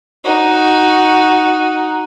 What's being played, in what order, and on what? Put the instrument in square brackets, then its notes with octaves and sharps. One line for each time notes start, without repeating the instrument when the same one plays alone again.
[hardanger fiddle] D#4 F#4